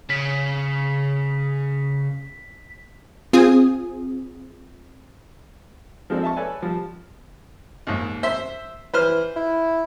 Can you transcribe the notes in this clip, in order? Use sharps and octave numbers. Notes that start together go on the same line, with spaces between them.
C#3 B6
C4 F4 G#4 G#5 D#6
F3 G#3 C4 A4 D5
D#5 E5 A5 C#6
A4 B4 C#5 D5 E5 G#5
F3 G3
D#2 G#2
C5 E5 C6
E3 B4 C5 F6
E4